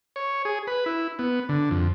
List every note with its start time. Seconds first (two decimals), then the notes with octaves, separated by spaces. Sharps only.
0.16 C#5
0.45 G#4
0.67 B4
0.86 E4
1.19 B3
1.49 D3
1.71 F2